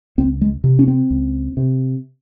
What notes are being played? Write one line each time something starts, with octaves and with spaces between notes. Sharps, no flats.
C#2 C4
G#3
C3
C#4
C4
C#2
C3